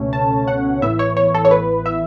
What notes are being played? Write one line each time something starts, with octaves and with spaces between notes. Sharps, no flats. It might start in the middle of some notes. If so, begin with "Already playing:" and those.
Already playing: C#2 B2 A3 C#4
A5
F#5
A1 A2 E3 B3 E4 E5
C#5
C#5
A4
C#5
B4
E5